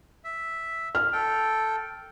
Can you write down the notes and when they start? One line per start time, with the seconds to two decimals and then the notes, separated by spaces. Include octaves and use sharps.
0.24 E5
0.95 F6
1.13 A4 G5